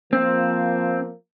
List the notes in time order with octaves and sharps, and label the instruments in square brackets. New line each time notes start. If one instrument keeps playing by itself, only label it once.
[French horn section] F3 A#3 [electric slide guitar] C4